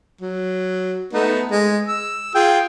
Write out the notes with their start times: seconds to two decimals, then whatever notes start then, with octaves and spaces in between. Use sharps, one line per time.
0.21 F#3
1.13 A3 B3 D#4
1.51 G#3
1.88 E6
2.35 F4 G#4 G5